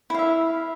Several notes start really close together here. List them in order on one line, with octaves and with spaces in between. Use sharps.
E4 F5 E5